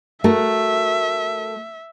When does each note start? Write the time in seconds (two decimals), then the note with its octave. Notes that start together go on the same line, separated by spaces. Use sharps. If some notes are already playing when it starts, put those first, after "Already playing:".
0.24 A3 F#4 A#4 E5